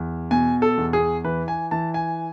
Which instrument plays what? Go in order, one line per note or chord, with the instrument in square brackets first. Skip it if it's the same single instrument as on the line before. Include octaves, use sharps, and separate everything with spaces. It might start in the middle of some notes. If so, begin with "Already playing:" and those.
Already playing: [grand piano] E2
B2 G#5
A4
E2
G#4
E3 B4
G#5
E3 A5
G#5